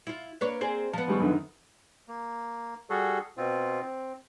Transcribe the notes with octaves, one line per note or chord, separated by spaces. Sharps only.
E4 F4
A#3 D4 B4 C#5
C4 G#4 C5
F3 B3 A5
G#1 G3 C#6
F#2 D3 D#3
A#3
G3 F#4 G#4 A4
B2 C4 F4
C4